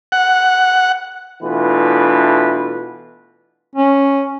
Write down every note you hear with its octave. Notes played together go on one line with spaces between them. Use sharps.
F#5
B2 E3 A3 D4 F4 B4
C#4